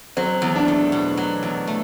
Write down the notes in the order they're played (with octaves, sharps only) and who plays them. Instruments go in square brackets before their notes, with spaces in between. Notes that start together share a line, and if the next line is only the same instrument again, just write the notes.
[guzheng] F#3 [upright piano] C4
[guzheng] E2
[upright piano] D4
[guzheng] A3
B2
F#3
E2
A3